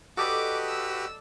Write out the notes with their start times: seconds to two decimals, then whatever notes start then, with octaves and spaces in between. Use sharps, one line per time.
0.17 F#4 G4 A4 B4 D5 D#5 D6
0.69 E6